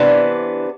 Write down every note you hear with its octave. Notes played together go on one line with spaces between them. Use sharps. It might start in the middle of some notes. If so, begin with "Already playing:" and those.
Already playing: C3 E3 B3 D4